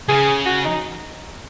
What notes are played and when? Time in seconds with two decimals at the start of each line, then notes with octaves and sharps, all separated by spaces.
0.08 C#3 G#4
0.46 F#4
0.65 D#4